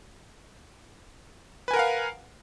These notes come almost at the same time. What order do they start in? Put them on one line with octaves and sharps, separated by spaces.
B4 G#5 A#4 F#5 F5